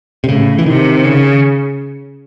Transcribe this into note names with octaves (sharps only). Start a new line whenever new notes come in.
C3
A2 C#3
E3
C3 D#3
C#3